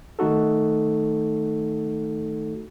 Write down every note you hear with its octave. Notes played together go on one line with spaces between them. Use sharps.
D#3 A3 D#4 F#4 A4